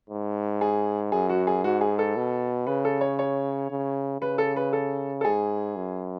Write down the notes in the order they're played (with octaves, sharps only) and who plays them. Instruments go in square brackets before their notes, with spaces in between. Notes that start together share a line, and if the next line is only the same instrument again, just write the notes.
[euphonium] G#2
[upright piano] G#4
[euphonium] F#2 [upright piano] G#4
[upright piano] F#4
G#4
[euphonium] G#2 [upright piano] F#4
[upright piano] G#4
A4
[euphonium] B2
[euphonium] C#3 [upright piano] B4
[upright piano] A4
C#5
C#5
[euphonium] C#3
[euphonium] C#3 [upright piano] B4
[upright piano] A4
B4
A4
A4
[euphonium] G#2 [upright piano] G#4
[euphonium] F#2